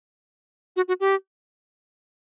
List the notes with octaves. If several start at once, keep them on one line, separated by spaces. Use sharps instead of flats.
F#4
F#4
G4